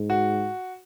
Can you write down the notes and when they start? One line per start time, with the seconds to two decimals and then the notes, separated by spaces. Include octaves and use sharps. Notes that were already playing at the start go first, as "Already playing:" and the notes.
Already playing: G#2
0.10 F#4